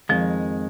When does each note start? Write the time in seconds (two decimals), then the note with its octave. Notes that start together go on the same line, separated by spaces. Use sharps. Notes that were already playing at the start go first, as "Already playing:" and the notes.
0.09 F2 D#3 F3 G#3